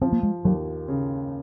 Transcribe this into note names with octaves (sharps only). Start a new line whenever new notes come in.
F3 C4
A#3
G#3
D#2 F#3
C#3